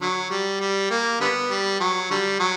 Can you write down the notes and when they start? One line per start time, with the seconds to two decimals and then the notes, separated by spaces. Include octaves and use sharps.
0.01 D3 F#3
0.30 G3
0.60 G3
0.90 A#3
1.20 D3 G3 B3
1.50 G3
1.80 F#3
2.11 D3 G3
2.39 F#3